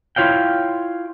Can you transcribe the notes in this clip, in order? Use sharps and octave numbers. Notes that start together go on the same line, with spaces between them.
E4 F4 C#5 F5 G5